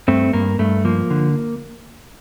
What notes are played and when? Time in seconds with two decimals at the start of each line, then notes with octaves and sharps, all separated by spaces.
0.08 G2 A3 C4
0.33 G2 A#3
0.59 G2 A3
0.85 F3 A#3
1.11 D3